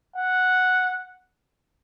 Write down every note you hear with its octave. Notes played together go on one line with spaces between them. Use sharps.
F#5